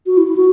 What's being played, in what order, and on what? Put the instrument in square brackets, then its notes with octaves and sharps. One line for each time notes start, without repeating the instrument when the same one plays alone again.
[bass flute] F#4
E4
E4
F#4